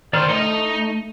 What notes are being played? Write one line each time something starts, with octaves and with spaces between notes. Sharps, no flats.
D#3 C5 D5 F6
A3 D#4 D#5